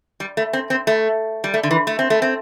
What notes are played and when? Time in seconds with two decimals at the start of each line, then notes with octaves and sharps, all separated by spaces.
0.20 G3
0.37 A3
0.53 C4
0.70 C4
0.87 A3
1.44 G3
1.54 A3
1.63 D3
1.71 E3
1.87 A3
1.99 C4
2.10 A3
2.22 C4